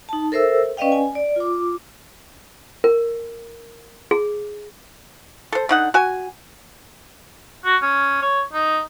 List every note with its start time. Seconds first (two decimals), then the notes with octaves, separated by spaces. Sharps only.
0.09 D#4 A5
0.32 A4 A#4 C5 E5 E6
0.77 C#4 B4 D5 D#5 F5 G5
0.92 G#5
1.15 D5
1.36 F4 D6
2.84 A#4
4.11 G#4
5.52 A4 C5
5.69 D3 D#4 F#5
5.94 F#4 G#5
7.65 F#4
7.82 C#4
8.22 C#5
8.53 D#4